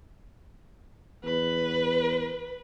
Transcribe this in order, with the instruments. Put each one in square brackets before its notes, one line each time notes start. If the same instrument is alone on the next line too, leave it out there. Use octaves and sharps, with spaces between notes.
[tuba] E2 [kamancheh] B4